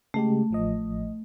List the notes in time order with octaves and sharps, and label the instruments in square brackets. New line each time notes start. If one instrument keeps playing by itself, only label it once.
[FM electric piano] C#3 G#3 G4 [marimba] A3
[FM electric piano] A1 F3 D#5